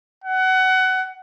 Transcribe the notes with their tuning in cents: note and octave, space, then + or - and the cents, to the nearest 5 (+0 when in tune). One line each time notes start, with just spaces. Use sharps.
F#5 +20